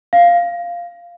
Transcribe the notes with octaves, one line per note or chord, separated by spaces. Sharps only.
F5